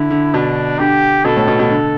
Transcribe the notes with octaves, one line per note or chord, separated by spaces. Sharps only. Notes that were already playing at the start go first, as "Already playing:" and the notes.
Already playing: D3 E4
D3
B2 D4
D3 G4
B2 A4
A2
B2
B2
D3